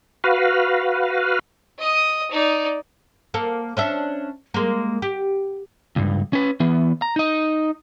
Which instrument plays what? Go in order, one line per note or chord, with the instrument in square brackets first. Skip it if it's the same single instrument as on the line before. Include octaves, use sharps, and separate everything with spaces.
[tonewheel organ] F#4 B4 F5
[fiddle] D#5 D#6
D#4 D5
[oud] A#3 A4
C#4 D4 E5
G#3 A#3
G4
[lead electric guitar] C#2 G2
C#4 B4
E3 B3
A#5
D#4 D#5